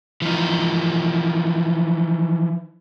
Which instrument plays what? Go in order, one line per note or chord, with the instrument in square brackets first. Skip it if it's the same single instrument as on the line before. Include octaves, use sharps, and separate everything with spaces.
[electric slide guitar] E3 F3 D#4